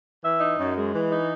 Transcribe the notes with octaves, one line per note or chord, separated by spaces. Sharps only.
E3 E5
D#4
F#2
G#3
E3
D#4